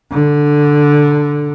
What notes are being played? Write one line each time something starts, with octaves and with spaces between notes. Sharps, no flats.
D3